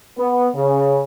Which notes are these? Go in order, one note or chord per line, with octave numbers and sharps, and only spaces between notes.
B3
C#3